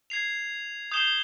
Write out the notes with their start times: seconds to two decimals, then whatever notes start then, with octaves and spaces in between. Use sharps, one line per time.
0.10 G#6 C7 F7
0.92 D#6 G6 C7 E7 G7